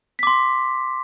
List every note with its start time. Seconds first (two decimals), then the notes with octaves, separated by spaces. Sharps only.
0.19 B6
0.23 D6
0.27 C6